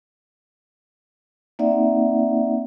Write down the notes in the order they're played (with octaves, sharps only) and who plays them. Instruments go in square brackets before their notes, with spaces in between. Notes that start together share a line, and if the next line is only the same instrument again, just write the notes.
[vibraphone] A#3 C4 D#4 D5 E5 F#5